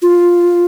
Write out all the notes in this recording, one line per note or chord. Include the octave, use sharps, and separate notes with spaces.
F4